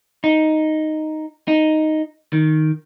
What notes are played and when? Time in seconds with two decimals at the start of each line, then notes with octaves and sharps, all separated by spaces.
0.24 D#4
1.48 D#4
2.33 D#3